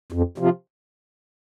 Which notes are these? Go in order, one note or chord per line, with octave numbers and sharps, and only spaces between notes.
F2
C3 F3